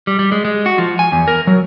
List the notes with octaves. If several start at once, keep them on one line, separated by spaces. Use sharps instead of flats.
G3
G3
G#3
G#3
F#4
F3
G#5
E2
A#4
F#3